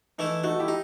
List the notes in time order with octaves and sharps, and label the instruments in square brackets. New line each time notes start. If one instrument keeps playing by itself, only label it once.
[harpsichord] E3 A3 E4 [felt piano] D#4
[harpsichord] A3 [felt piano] D#4 F#4
[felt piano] E4 G4
[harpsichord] D#4